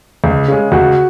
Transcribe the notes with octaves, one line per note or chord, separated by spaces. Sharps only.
C#2
C#3 G#3
C#2 F#4